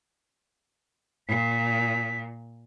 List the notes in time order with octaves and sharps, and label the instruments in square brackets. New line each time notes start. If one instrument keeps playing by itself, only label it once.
[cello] A#2 [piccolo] B6